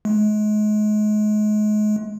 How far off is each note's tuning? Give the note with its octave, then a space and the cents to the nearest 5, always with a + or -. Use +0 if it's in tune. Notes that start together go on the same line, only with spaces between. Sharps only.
G#3 +35